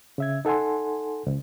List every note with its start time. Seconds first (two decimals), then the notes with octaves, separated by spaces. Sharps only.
0.18 C#3 E5 G#6
0.45 D#4 A4 F#5 G#5 C6
1.27 C#2